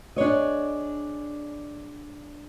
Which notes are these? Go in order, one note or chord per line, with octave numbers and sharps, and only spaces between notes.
D4 G#4 C#5 D#5